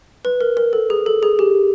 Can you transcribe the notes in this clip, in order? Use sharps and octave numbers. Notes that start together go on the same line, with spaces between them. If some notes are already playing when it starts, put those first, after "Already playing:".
B4
A#4
A#4
A4
G#4
A4
G#4
G4